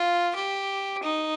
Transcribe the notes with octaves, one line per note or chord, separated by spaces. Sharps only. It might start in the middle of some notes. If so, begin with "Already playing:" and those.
Already playing: F4
G4
D#4